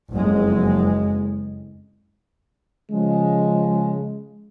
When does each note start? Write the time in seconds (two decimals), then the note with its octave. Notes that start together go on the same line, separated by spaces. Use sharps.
0.12 F#1 F2 G#3
2.92 C#3 F3 G#3